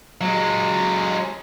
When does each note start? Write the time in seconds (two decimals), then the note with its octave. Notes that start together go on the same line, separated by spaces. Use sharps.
0.21 F#3 G#3